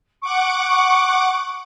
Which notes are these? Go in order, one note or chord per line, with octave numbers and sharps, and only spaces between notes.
F#5 C#6 D6